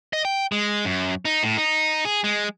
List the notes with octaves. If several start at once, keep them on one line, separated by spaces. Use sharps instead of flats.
D#5
G5
G#3
F#2
D#4
A2
D#4
G#4
G#3